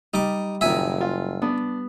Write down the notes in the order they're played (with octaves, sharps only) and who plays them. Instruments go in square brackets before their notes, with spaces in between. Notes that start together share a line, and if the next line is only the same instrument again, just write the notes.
[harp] G3 [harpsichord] D#4 D6
[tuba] F#1 [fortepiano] A#2 D#3 [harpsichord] E5 G#5
[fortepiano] F4
[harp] B3 [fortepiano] D4